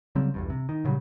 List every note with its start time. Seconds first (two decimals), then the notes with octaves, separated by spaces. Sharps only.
0.15 C#3 F#3 G3 C4
0.34 B1 E2 G2
0.50 C3
0.69 D#3
0.85 A#2 C#3 F#3 G3